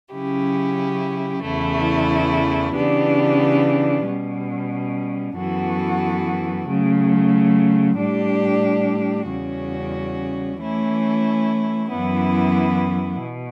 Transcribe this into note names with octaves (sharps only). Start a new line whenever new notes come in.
C#3 F#3 C#4 E4 G4
E2 C#3 E3 A3 E4
C#3 E3 B3 D4 G4
B2 G3 C#4
F#2 E3 B3 F#4 A4
C#3 F#3 A3
A2 G3 D4 G4
E2 C#3 G3 C#4 F#4
E3 A3 C#4 E4
F#2 E3 B3 E4
B2